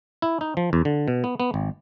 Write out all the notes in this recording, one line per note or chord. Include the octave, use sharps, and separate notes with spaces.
E4
D#4
F3
E2
D3
B2
B3
B3
G#1